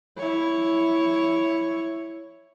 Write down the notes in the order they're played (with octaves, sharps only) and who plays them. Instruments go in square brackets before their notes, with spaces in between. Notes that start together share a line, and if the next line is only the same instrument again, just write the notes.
[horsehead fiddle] E4 C#5